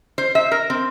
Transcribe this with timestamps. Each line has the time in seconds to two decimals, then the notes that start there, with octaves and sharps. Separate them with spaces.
0.18 C5
0.35 E5
0.52 A#4
0.70 C4